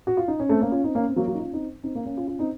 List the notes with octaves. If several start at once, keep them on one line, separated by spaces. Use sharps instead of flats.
F#4
F4
D#4
C#4
A3 C4
A#3 C#4
C#4 F4
C4 D#4
A#3 C#4
C4
F#3 A#3
F#3 A#3
D#4
C#4 F4
C4 D#4
C4 D#4
A#3 C#4
A#3 C#4
C#4 F4
C#4 F4
C4 D#4